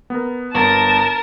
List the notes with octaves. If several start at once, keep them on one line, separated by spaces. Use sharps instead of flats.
B3 A#4
G1 B3 A#4 A5 A6